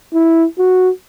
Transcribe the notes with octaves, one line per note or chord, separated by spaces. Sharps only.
E4
F#4